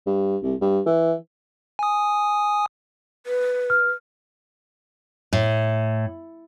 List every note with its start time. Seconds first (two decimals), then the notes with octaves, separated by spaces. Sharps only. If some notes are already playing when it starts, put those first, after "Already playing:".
0.06 G2
0.43 C2
0.61 G2
0.86 E3
1.79 G#5 D#6
3.26 B4
3.70 F6
5.33 A2